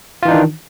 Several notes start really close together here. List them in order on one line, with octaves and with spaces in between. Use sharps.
F4 E3 D#4 D4 D#3